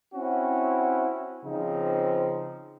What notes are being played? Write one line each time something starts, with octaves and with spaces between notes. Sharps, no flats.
C4 C#4 E4 F#4
C#3 F3 C4 D#4